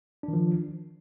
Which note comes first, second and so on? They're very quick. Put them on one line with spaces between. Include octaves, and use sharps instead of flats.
D4 D#3 F3